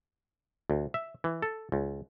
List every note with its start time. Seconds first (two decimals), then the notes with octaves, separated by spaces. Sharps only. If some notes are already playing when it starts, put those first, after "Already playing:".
0.70 D2
0.94 E5
1.24 E3
1.42 A4
1.72 C#2